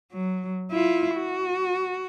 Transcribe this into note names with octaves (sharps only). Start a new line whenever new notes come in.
F#3
E4 F4
F#4